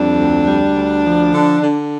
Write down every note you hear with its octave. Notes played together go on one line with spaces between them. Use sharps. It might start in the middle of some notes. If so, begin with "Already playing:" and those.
Already playing: F2 G3 D4
D2
G3
D2
F3
D3
D3